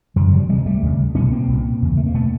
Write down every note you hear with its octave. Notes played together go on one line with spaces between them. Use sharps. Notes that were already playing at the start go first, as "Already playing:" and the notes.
F#2 C#3 E3 F#3
F3 G3
D2 C3 F#3 G#3
G3 A3
D#2 C#3
C2 B2 B3 C#4
B3
A#3 C4
C2 A#2
E2 C#3
A3
A#3
B2 A3 B3